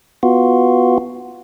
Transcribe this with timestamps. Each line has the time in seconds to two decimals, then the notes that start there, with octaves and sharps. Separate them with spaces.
0.23 B3 F4 F#4